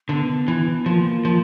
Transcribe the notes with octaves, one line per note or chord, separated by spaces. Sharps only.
D3 B3
E3
F3 A#3
F3